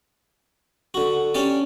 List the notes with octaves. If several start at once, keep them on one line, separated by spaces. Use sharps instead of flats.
D3 F#4
C#4 D4 G4 D5